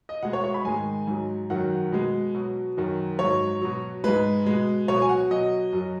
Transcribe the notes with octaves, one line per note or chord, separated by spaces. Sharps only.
D#5
B2 G#3 F#5
C#5
C#5
B5
G#2 D#3 G#3 G#5
G#2 F#3
F#2 D#3 F#3 F#5
B2 G#3
B2 F#3
F#2 D#3 F#3
G#2 F#3 C#5
B2 F#3
G#2 G#3 B4
B2 G#3
B2 F#3 C#5
G#5
F#5
B2 F#3 D#5
F#2 F#3